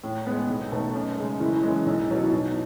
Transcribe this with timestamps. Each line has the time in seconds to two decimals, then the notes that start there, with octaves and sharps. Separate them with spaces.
0.04 A2
0.27 G#3 B3
0.49 B1
0.72 B2 A3 D#4
0.94 F#2
1.18 C#3 G#3
1.40 F#1 E4
1.63 F#2 E3 G#3
1.86 B1
2.10 B2 F#3 F#4
2.24 E4
2.32 B2 D#4